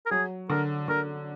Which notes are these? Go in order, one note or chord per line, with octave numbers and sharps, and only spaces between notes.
A#4
F#3 G#4
D3 A#4
D3 A#4